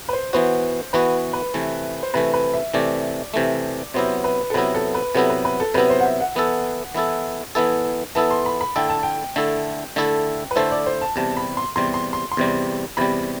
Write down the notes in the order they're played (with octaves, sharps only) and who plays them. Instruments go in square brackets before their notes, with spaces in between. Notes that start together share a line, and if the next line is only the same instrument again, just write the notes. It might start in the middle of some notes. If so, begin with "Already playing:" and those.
[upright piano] B4
C5
[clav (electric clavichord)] E3 B3 F#4 [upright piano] C5
[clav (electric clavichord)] E3 B3 F#4 [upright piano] B4
[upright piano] B4
[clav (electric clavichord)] C3 E3 A3
[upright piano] C5
[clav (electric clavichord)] C3 E3 A3 [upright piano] B4
[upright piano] B4
E5
[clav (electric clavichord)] C3 E3 A3 [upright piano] D5
[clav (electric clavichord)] C3 E3 A3
[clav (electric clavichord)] C3 F#3 B3 E4 [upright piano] C5
[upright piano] B4
A4
[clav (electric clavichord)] C3 F#3 B3 E4 [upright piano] B4
[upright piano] A4
B4
[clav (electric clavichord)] C3 F#3 B3 E4 [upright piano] A4
[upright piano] B4
B4
A4
[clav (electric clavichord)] C3 F#3 B3 E4 [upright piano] B4
[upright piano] C5
F#5
E5
F#5
[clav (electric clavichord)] E3 B3 E4 A4
E3 B3 E4 A4
E3 B3 E4 A4
[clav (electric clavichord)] E3 B3 E4 A4 [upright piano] A5
[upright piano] C6
B5
B5
[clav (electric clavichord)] D3 A3 E4 A4 [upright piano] G5
[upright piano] A5
G5
[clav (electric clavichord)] D3 A3 E4 A4
D3 A3 E4 A4
[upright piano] B4
[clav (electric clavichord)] D3 A3 E4 A4 [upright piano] C5
[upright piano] D5
C5
A5
[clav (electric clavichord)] E2 C3 G3 [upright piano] A5
[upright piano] B5
C6
[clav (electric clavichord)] E2 C3 G3 [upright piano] C6
[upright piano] C6
C6
C6
[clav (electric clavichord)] E2 C3 G3
[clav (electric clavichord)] E2 C3 G3 [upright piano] B5